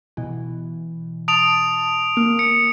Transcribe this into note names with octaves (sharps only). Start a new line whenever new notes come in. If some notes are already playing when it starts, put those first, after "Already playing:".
B2 E3
A5 D#6 D7 F7
A#3
C#7